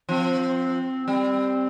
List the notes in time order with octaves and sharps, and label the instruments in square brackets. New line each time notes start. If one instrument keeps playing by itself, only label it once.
[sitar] F3 [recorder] C4
[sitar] G3 [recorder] C4